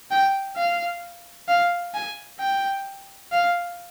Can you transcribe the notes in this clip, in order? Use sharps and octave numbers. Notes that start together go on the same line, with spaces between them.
G5
F5
F5
G#5
G5
F5